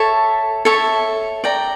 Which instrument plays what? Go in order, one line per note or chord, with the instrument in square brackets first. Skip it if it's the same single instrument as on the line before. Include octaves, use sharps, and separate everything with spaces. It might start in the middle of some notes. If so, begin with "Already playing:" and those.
Already playing: [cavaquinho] A4 C#5 E5 A5
A4 C#5 E5 A5
D5 G5 A#5